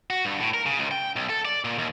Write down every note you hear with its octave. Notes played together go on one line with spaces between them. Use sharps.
F#4
G2
A2
A#4
C#3
C#2
G5
B1
A4
D5
A#2
D#2